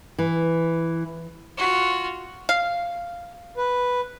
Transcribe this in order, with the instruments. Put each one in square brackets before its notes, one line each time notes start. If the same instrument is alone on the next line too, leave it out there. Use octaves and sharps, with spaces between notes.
[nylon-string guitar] E3
[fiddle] F4 F#4
[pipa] F5
[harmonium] B4